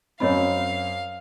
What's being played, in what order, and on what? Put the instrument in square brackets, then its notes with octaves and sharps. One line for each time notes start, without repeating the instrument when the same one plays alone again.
[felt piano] F#2 C4 [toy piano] C#5 D#5 B5 [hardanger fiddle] F5